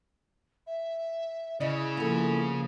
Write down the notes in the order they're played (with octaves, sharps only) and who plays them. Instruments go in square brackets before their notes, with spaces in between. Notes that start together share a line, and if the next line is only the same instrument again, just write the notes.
[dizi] E5
[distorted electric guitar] C#3 [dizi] E4 [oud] D5 D#5
[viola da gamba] F3 A#3 [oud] B3 A4